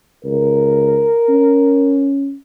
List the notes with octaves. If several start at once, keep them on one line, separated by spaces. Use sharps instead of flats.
C#2 A#4
C#4